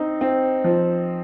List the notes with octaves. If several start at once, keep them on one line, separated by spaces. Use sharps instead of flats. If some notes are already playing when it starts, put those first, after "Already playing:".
Already playing: C4 D#4
C4
F3